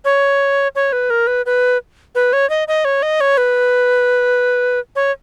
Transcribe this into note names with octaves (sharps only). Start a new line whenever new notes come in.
C#5
C#5
B4
A#4
B4
B4
B4
C#5
D#5
D#5
C#5
D#5
C#5
B4
C#5